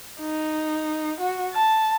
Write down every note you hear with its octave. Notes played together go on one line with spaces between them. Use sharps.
D#4
F#4
A5